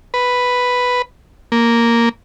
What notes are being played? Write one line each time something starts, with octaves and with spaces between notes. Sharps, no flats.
B4
A#3